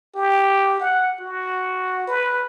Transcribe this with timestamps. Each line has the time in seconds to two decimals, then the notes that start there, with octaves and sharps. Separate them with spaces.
0.15 G4
0.80 F#5
1.20 F#4
2.07 B4